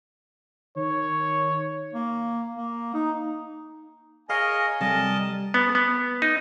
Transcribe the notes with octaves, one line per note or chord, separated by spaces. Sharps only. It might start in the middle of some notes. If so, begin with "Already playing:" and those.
D#3 C#5
A#3
A#3
D#4
G#4 A#4 C#5 D#5 F5 G#5
C3 G3 A#4 D#5 A5
B3
B3
D#4